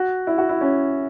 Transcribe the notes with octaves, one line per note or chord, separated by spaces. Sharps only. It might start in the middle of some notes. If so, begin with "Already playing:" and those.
Already playing: F#4
E4
F#4
E4
C#4